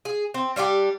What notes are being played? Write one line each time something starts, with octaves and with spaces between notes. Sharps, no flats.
G#4
C4
G3 D4 F4 G4